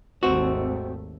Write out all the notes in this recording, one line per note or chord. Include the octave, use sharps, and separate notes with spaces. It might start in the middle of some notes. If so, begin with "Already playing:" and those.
G#1 D#2 A3 C4 F#4